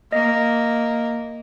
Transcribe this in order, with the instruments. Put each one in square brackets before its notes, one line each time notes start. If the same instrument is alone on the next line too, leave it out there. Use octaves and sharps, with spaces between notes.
[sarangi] A#3 [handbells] D#5